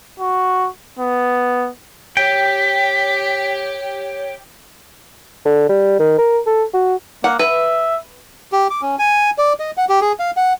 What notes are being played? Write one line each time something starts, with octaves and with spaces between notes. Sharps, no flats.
F#4
B3
G4 C#5 G5 B6
D3
G3
D#3
A#4
A4
F#4
A#3 F#5
B4 E5
G4
D6
C#4
G#5
D5
D#5
F#5
G4
G#4
F5
F#5